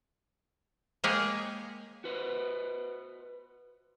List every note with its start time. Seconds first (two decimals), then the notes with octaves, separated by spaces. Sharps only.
1.04 G#3 A#3 G4 G#4 C#5
2.04 F#4 B4 C5